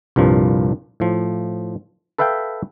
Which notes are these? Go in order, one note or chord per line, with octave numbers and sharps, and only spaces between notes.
C2 G2 A#2 F3
A2 F3
A4 B4 E5 F5 G5